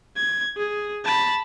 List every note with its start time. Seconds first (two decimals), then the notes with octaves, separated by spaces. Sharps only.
0.17 G#6
0.57 G#4
1.05 A5 B5